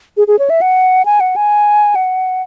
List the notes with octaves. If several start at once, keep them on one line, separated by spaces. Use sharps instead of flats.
G#4
G#4
C#5
E5
F#5
G#5
F#5
G#5
F#5